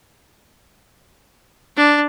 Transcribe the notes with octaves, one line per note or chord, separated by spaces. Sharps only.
D4